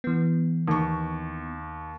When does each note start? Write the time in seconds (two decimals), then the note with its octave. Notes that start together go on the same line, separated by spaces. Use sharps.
0.04 E3 B3
0.68 D#2 C#6